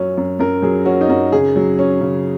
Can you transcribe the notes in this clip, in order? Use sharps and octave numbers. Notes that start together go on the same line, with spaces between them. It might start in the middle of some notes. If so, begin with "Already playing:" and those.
Already playing: F#2 F#3 C#4
F#2
F#2 A#4
F#3 G#4
C#4 F#4
D#4
F#2 F#4
C#3 G#4
F#3
C#4
C#3